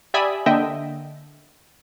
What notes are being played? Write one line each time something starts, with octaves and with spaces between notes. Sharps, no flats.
G4 D5 E5 G#5 B5 D#6
D3 A#3 D#5 E5 G5